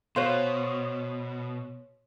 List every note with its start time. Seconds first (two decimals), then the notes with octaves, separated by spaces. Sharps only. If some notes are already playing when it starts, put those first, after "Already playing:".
0.16 B2 F#4 C5 C#5 F5 C6